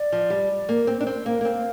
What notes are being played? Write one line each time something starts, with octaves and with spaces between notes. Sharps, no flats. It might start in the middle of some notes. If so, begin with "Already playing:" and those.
Already playing: D5
F3
G3
A#3
C4
D4
C4
A#3 F5
A#3
C4